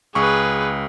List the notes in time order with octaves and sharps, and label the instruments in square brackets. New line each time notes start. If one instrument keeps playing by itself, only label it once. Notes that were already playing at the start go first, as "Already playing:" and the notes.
[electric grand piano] C#2 C#6 [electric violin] G#4 B4